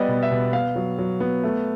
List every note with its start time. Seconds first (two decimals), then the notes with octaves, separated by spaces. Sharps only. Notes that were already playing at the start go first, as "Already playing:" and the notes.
Already playing: G3 B3 D5 D#5
0.08 B2
0.23 E5
0.31 B2
0.53 B3 F5
0.76 F#3
0.98 F#3
1.20 B3
1.43 A3